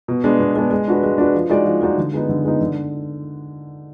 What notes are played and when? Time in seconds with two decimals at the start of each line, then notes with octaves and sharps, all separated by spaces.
0.08 B2
0.24 G#3 B3 D4
0.40 B2
0.56 G#3 B3 D4
0.71 G#3
0.88 D4 F#4 B4
1.03 G#3
1.18 D4 F#4 B4
1.35 F3
1.50 G#3 D#4 F#4 D5
1.65 F3
1.82 G#3 D#4 F#4 D5
1.98 D3
2.13 G#3 B3 D#4
2.29 D3
2.45 G#3 B3 D#4
2.61 D3